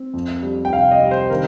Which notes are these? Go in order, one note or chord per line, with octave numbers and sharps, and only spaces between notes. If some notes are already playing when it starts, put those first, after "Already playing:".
Already playing: C4
F2
G3
G5
C3 F5
D#5
G3
C5
D#3 A#4